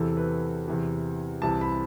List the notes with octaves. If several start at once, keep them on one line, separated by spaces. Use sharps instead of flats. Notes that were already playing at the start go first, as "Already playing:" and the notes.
Already playing: E2 C3 E3 A4
B4
E2 C3 E3
C2 C3 E3 A5
B5